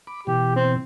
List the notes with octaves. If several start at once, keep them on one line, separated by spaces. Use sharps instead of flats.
B5 D6
B2 E3 G4
C4